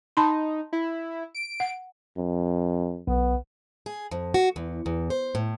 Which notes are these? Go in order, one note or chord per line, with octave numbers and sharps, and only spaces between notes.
D#4 A5 B5 C6
E4
D7
F#5
F2
B1 B3
G#4
F2
F#4
E2
E2
C5
A2